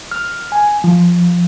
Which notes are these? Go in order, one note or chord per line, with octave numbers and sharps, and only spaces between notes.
F6
G#5
F3